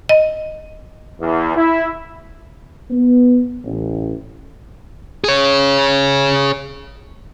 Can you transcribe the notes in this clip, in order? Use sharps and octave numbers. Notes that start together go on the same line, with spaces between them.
D#5
E2
E4
B3
A1
G#4 C#5